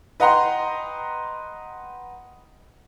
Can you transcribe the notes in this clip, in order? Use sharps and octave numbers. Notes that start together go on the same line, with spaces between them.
B4 D#5 F#5 G5 A#5 C6